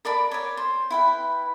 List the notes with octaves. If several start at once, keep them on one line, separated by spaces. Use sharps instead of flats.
A#4 D5 A5 B5
C#5 D5
C5
E4 B4 G5